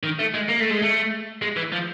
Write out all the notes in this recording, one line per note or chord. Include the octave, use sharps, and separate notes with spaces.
D#3
A3
G#3
A#3
A3
G#3
A3
G#3
E3
F3